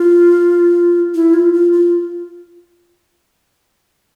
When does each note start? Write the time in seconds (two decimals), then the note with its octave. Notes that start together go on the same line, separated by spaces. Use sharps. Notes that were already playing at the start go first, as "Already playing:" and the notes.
Already playing: F4
1.15 E4
1.34 F4
1.53 F4
1.73 F4